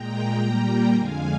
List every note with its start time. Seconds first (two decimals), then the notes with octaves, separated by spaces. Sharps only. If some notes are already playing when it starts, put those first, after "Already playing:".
Already playing: A#2 G#3 G5 A#5
0.39 A#2 G3 A#3 G5 A#5
0.93 F2 D3 G#3 F5 G#5